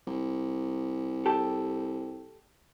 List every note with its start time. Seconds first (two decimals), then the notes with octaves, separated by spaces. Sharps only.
0.07 C2
1.26 G4 A4